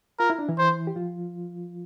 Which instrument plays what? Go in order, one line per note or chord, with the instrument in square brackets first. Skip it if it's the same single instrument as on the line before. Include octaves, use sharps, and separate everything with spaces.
[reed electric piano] F4 [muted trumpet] A#4
[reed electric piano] E4
D4
E3 E4
[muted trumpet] C5
[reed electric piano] G4
F3 F4